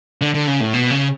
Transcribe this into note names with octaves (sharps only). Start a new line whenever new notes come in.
D3
D3
C#3
A2
B2
C#3